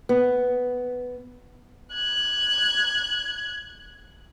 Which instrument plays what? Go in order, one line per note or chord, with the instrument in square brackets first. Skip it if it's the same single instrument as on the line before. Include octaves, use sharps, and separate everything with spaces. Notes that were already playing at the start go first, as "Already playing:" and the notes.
[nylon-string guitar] B3
[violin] F#6 G#6